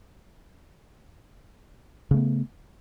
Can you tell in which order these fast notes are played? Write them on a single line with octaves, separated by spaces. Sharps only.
C#3 A3 B3